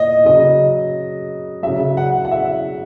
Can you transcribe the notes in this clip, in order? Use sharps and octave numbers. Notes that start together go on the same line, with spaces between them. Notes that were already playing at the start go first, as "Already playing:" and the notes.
Already playing: A#2 D#5
C#3 F#3 D#5
C#3 F#3 E5
F#5
F#5
E5